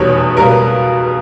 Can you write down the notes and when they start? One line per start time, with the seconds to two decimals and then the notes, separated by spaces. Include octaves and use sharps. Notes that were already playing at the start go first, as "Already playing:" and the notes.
Already playing: F1 E2 B2 G3 C#5
0.37 C#2 B2 G3 A#4
0.48 B4